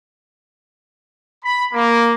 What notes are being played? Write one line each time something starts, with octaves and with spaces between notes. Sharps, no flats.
B5
A#3